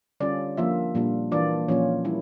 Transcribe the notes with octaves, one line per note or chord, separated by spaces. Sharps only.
D3 G3 C#4 F4 D5
F3 A#3 D4 F4 E5
A#2 G3 D4 F4
E3 A#3 D4 F4 D5
A#2 F3 C#4 F4 C#5
G3 A#3 E4